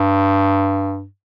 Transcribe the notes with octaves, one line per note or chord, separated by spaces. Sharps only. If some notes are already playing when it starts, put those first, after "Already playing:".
Already playing: G2